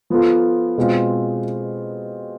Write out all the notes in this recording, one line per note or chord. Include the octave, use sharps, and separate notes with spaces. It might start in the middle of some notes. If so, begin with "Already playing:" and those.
F3 B3 F4 A4
B2 G#3 C4 F4